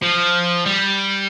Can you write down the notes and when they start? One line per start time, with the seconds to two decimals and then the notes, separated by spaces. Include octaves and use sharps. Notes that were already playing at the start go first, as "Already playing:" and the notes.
0.02 F3
0.66 G3